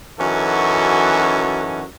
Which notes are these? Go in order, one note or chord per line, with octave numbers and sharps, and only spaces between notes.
F#2 E3 C#4 D#4 F#4 A4